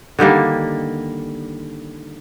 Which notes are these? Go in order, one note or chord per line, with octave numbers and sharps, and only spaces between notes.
D3 D#3 G3 A#3